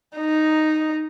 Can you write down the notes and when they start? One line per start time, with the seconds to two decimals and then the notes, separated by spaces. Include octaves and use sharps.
0.17 D#4